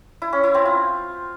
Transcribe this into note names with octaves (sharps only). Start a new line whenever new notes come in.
E4
C#4
E4
C4
F4